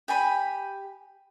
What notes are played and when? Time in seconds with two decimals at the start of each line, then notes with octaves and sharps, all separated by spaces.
0.08 G4 G#5 B5